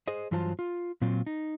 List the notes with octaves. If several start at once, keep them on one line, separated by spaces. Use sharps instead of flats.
G#4 C5 D#5
G2 E3 F#3 F4 C5 A5
F4
A#2 F#3 C4 F4
D#4